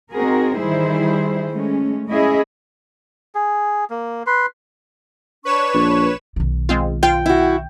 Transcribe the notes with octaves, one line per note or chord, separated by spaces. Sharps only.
C4 D#4 F#4 G#4 A#4
D#3 E3 G3 E4 G#4 C5
G#3 A3 C#4
G#3 C#4 E4 G#4 D#5 E5
G#4
A#3
B4 C6
D4 B4 C#5 C#6 E7
A#1
B1 D#3
G#3 C4 F4
F4 G5
E4 F#4